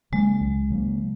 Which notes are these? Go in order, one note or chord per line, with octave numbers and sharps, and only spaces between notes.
C#3 F#3 G#3 A#3
C#2
C#3 F#3 A#3